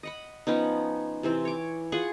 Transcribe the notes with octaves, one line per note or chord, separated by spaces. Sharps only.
D#5 F#5 B5
F3 B3 C#4 D#4
C3 E3 C4
C#5 D6
F4 G#4 F#5 C#6